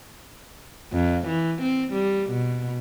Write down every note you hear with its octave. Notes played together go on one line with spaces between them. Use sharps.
F2
E3
C4
G3
B2